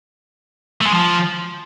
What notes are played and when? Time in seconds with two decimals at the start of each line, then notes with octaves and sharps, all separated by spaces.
0.81 A3
0.86 G#3
0.92 F3